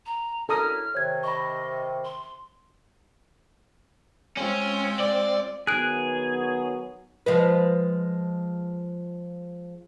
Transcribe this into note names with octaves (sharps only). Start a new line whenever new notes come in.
A#5
F#2 E4 A4 A#5 D#6 F6
C3 D#3 C#5 G#6
D#5 B5 C#6
C6
G#3 C4 C#4 F4
D5
D#3 F#3 B3 G#4 F#6 D7
F3 G#3 B4